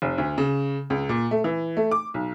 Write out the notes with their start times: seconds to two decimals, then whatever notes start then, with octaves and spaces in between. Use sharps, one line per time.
0.02 F1
0.18 D2
0.38 C#3
0.90 C#2
1.09 A#2
1.31 A3
1.44 E3
1.77 A3
1.91 D6
2.14 B1